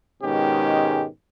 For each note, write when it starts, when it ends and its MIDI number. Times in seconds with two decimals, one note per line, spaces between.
0.23 1.05 44
0.23 1.05 47
0.23 1.05 51
0.23 1.05 56
0.23 1.05 61
0.23 1.05 67